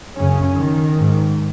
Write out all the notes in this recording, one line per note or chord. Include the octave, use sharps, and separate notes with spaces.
F#2 C#3 C#4
D#3
G#2